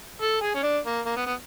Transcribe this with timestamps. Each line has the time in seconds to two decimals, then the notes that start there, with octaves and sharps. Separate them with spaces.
0.22 A4
0.42 G#4
0.55 C#4
0.63 D4
0.85 A#3
1.06 A#3
1.16 B3
1.26 B3